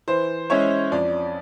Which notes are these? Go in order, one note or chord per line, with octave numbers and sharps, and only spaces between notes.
E3 C5
G#3 C#4 E4 C#5
F2 D5